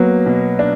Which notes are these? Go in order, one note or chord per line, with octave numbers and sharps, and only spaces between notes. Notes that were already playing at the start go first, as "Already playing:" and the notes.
Already playing: F#3 A#3 B3
B2
D4